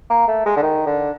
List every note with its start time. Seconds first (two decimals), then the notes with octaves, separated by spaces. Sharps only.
0.10 A#3
0.28 A3
0.46 G#3
0.56 D3
0.62 D#3
0.86 D3